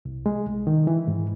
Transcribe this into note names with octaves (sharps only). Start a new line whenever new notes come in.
C2
G#3
C2
D#3
E3
G#2